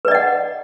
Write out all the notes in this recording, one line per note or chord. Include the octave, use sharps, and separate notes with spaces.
B4 D5 D#5 F#5